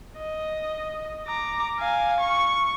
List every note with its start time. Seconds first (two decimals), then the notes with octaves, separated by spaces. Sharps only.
0.18 D#5
1.27 A#5 D6
1.79 F5 G#5
2.20 C#6